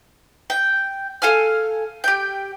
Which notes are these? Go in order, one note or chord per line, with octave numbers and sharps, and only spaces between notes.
G5
A4 F5 G#5 F6
G4 G5